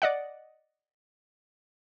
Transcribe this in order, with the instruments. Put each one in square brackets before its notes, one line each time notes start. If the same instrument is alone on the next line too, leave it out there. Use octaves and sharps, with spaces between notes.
[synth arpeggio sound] D5 D#5 F#5